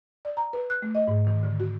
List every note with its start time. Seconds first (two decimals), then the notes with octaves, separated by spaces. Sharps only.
0.25 D5
0.37 A#5
0.53 B4
0.70 F#6
0.82 A3
0.95 D#5
1.08 G#2
1.27 D#3
1.43 D3
1.60 F#4